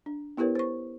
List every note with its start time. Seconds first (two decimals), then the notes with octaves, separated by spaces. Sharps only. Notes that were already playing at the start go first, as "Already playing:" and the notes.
0.06 D4
0.37 B3 E4 G4 A#4 B4 C#5
0.55 C5 C#6